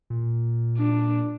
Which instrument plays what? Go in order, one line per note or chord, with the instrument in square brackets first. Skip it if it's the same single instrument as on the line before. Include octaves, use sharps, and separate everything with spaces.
[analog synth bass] A#2
[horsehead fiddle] D4